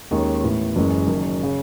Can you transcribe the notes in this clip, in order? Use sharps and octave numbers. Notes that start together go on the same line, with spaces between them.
D#2 D#3 G#3 C#4 G#4
A2 E3 B3
F#1 F#2 E3 G#3
F#1 F#2 D#3
C#3